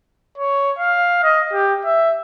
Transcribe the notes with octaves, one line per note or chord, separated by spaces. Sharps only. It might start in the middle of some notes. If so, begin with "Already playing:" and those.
C#5
F5
D#5
G4
E5